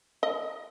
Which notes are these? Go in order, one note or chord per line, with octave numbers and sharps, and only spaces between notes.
D#5